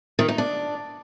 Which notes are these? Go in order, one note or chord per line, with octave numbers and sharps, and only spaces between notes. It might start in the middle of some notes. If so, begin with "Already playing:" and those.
D#3
D#4
D4